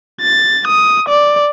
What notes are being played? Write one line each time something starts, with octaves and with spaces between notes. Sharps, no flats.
A6
D#6
D5